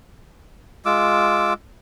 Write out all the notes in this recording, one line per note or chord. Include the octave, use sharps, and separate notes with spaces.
G#3 F4 D6 E6